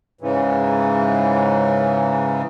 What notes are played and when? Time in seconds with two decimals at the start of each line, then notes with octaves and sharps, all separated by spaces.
0.21 G#2 C#3 E3